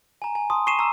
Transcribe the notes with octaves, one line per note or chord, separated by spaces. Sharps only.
G#5 A#5
G#5
A5 C6 D#6
C#6 C7 D#7 E7
A#5 E6